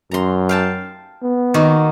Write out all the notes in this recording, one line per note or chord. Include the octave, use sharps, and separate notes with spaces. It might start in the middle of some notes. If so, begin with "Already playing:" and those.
F#2 A#5 C6
F5 G5 A5
B3
D#3 A#3 F#4